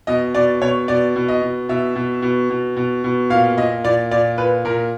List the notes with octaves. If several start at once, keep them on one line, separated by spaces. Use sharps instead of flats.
B2 D#5
B2 D5
B2 C#5
B2 D5
B2
D#5
B2
B2 E5
B2
B2
B2
B2
B2
A#2 F5
A#2 D#5
A#2 D5
A#2 D5
A#2 B4
A#2 A#4